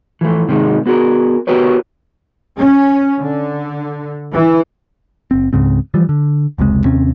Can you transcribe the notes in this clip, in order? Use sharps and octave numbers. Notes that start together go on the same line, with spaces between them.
E3 F3 A3
G#2 C3 D#3 G3 G#3
B3 F#4 G#4 A#4
B3 F#4 G4 A#4 B4 C#5
C#4
D3
E3
F#1 C4
C#2 G#2 C#3 C4
E3 F3 G3
D3
F1 C#2 C3 G#3
D#2 C3 C4 C#4